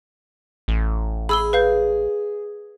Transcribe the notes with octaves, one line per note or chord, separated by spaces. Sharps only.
A1
G#4 B5 E6 G7
B4 F5 G6